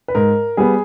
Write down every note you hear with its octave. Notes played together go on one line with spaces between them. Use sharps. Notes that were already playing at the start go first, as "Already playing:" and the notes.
B4
G#2 A#4
G3 B3 G#4